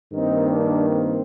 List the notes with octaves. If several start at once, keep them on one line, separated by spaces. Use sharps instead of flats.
G2 D#3 A#3 C4 D#4
D4
C4